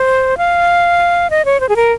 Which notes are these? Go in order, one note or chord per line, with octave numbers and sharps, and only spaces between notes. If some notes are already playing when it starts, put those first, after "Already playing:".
Already playing: C5
F5
D#5
C#5
C5
G#4
A#4